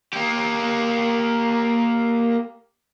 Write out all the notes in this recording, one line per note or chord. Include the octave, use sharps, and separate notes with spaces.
A#3 G4